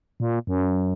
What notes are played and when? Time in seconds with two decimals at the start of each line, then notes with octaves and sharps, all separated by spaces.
0.20 A#2
0.47 F#2